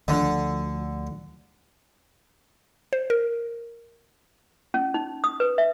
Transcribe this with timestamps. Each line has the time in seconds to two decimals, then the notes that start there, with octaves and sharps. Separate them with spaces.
0.08 D2 D3 F3
2.93 C5
3.10 A#4
4.74 C#4
4.94 D#4
5.24 D#6
5.40 B4
5.58 E5